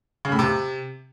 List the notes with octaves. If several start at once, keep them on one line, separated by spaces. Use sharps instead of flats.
C#3
A2
C3